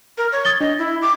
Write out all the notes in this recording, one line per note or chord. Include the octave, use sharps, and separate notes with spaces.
A#4
C#5
D#6 A6 G7
D4 D#5
E4
D6